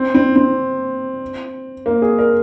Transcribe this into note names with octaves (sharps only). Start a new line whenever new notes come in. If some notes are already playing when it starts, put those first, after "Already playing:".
Already playing: C4
C4
C4
A#3
G#4
A#4